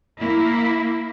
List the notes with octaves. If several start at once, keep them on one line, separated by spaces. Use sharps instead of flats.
A#3 E4